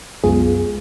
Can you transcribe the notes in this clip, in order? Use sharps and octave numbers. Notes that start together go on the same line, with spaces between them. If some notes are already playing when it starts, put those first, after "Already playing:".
C2 F#2 G#3 B3 F4 G#4